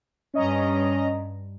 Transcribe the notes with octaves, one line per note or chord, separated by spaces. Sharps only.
G2 C#4 D#5 A#5